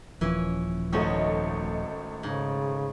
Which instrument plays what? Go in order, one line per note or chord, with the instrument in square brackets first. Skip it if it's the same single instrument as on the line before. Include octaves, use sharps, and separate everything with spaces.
[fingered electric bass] D#1 F3 [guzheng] E3 C#4
[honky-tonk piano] G#1 A3 D#5 [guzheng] C#4 D#4 F#4
[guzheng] G#2 [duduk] C#3